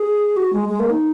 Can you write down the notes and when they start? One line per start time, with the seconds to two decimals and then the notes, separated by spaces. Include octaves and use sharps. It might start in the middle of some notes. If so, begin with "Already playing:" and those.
Already playing: G#4
0.37 F#4
0.53 G#3
0.69 G#3
0.80 A#3
0.90 D#4